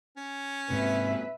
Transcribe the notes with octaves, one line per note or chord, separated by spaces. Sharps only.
C#4
G#2 C3 B4 E5